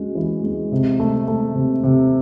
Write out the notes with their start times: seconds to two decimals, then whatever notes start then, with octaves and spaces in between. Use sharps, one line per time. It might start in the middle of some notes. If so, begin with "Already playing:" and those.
Already playing: G#3 C#4 F#4
0.15 E3
0.44 G#3
0.72 C3
1.00 A3
1.28 A3
1.55 C3
1.84 C3